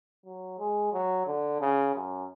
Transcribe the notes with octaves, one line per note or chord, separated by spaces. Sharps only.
F#3
G#3
F#3
D3
C#3
F#2